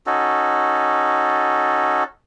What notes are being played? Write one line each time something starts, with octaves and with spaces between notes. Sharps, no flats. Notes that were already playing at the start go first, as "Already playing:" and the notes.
C#4 D#4 F#4 A4